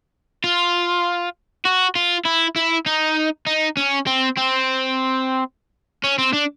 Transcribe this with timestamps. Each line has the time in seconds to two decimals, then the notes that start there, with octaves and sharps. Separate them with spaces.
0.44 F4
1.65 F#4
1.95 F4
2.25 E4
2.56 E4
2.86 D#4
3.46 D#4
3.77 C#4
4.07 C4
4.37 C4
6.04 C#4
6.18 C4
6.33 D4